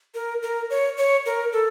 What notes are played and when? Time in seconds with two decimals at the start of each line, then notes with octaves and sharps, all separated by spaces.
0.15 A#4
0.43 A#4
0.70 C#5
0.97 C#5
1.26 A#4
1.53 A4